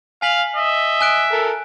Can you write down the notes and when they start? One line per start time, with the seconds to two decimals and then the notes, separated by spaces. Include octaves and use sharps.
0.22 F5 G#5 B6 F#7
0.56 D#5 E5
1.01 G#5 F#6 D7
1.32 A4 A#4